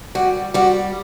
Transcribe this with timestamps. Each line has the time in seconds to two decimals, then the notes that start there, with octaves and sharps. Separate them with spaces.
0.15 G3 F#4
0.54 G3 F#4